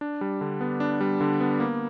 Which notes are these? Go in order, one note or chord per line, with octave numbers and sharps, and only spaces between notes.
D4
G3
D3
B3
D4
G3
D3
B3
A#3